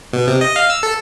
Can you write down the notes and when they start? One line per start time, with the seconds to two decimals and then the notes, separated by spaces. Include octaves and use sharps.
0.13 B2
0.27 C3
0.41 D#5
0.56 F5
0.70 E6
0.83 A4